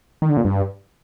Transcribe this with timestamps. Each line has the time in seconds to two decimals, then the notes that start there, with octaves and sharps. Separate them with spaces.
0.22 D#3
0.30 D3
0.37 A#2
0.45 G2